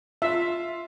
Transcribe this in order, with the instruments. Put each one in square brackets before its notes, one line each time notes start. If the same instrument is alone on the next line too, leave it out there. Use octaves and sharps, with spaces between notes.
[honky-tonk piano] F4 [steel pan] E5